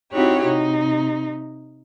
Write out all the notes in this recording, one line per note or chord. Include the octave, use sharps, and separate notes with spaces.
C4 D#4 E4 F#4 G4 C#5
C3 D#4